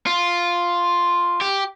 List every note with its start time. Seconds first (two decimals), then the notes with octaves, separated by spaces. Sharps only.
0.07 F4
1.41 G4